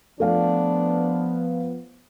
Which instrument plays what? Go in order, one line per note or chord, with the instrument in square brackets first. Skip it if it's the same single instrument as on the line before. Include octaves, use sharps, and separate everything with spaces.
[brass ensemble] F3 B3 [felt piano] A3 A4 F5 [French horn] D4